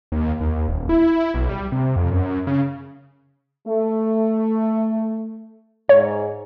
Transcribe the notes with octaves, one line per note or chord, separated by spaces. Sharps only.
D#2
D#2
D#1
E4
B1
G3
C3
F2
F#2
C#3
A3
G#2 C#5